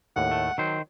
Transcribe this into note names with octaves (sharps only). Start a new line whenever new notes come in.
D#2 A2 F#5
A3
D#3 F#3 C5